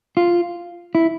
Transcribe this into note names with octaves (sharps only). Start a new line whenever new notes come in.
F4
E4